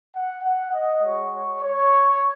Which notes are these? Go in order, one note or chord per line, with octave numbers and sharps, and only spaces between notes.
F#5
F#5
D#5
G#3 F#4 C#5
C#5
C#5